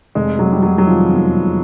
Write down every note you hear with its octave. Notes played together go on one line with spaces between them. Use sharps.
F1 G#3
C3 F#3
G3
F1 F#3
F#3
D#3 F3
E2
C3